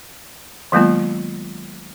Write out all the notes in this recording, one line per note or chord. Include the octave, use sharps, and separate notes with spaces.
D#3 F#3 G#3 A#3 B3 F4